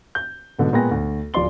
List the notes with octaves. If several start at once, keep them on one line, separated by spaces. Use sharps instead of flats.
G6
G#2 B2 D3 F#3
A#2 G#3 B3 G5 G#5 A#6
D2
D1 F4 D5 C6 G7